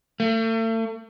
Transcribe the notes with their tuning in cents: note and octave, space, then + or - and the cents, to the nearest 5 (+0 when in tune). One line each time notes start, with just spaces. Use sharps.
A3 +40